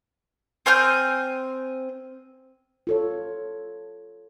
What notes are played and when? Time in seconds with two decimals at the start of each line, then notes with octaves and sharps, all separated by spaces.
0.66 C4 G#5 F6 G6
2.87 F4 A4 C#5